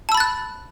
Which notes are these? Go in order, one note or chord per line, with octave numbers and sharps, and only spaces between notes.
A5 B5 E6 F#6 A6